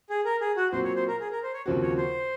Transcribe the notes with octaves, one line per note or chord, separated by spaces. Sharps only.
G#4
A#4
G#4
F#4
A#2 F#3 C4 C5
C#5
C5
A#4
G#4
A#4
C5
C#5
D#2 C#3 F3 C4 F#4
C#5
C5